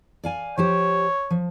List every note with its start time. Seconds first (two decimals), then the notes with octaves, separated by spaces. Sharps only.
0.23 D5 F5 G#5
0.58 F3 G4 C5 C#5
1.30 F3